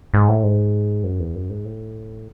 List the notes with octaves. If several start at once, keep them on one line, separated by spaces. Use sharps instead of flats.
G#2
A2
G#2
F#2
E2
F#2
G#2
A2